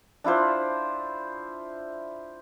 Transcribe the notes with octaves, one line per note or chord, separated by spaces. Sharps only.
D4 E4 F4 C5